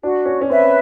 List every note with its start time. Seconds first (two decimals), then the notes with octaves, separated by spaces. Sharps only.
0.03 D4 F#4
0.26 C#4
0.41 C#4
0.49 C4 B4 E5